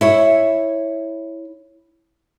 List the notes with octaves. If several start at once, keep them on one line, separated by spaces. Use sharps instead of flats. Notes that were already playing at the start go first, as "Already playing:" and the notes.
E4 C#5 E5